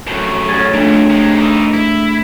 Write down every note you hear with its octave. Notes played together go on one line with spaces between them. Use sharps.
F#2 A2
G#4 C#5 A6
F2 A#2 A3 D4
C3 G#3
E3 D#4
E4